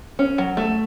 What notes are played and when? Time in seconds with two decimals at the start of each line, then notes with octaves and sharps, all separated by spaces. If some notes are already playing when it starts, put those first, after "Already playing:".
0.19 C#4
0.38 F#3
0.57 A3